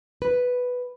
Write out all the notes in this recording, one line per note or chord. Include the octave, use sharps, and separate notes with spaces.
B4